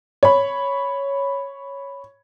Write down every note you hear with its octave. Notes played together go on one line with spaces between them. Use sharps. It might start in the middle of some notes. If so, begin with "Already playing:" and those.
C#5 B5